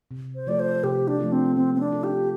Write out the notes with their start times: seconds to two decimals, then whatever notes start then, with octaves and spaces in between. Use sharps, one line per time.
0.11 C3
0.35 C5
0.47 F3 A3 F4 A4 D5
0.59 C5
0.83 C3 G4
1.08 D4
1.19 F3 A3 F4 A4
1.32 C4
1.56 F3 C4
1.74 C4
1.80 D4
1.92 C4 F4 A4
2.04 G4